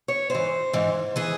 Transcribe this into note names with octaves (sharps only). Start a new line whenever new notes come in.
C#5
G#2 E3 C5
G#2 E3
E3 G#4